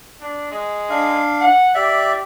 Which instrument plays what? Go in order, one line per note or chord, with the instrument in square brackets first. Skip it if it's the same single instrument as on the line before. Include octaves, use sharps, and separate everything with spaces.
[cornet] D4
G#3
[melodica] D4 F5
[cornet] F#5
[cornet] G4 [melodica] D5 E5